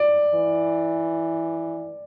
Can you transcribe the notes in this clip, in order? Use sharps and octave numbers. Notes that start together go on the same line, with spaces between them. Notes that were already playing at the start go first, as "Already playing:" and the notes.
Already playing: D5
E3